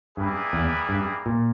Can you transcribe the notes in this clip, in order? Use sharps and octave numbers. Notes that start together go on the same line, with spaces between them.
G2 G3 A#3 E4 G#4 B4
E2
G2
A#2